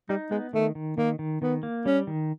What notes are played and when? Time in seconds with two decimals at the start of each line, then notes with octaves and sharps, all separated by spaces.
0.09 G3 D#4
0.31 G#3 B3
0.53 D#3 A3
0.75 D#3
0.97 D#3 A#3
1.19 D#3
1.41 D#3 B3
1.63 A#3
1.85 G3 C#4
2.07 D#3